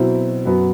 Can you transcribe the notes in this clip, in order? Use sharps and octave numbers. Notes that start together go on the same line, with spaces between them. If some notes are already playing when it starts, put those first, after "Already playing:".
Already playing: B2 F#3 C4 E4
F#2 F#3 B3 F#4